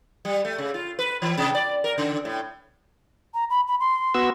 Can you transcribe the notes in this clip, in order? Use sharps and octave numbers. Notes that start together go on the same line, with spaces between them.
G3
A3
C#3
F4
B4
E3
C3
D5
A#4
C#3
A2
A#5
B5
B5
C6
B3 F#4 E6